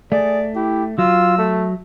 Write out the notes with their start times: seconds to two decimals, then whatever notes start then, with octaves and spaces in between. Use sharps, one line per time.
0.12 A3 G#4 D5
0.56 E4 G4
0.99 F#3 F4 E6
1.38 A3